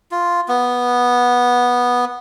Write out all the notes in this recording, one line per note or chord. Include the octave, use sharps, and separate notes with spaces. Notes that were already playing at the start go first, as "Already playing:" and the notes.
F4
B3